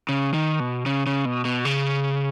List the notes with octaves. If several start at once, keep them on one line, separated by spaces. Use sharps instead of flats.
C#3
D#3
B2
C#3
C#3
B2
B2
C#3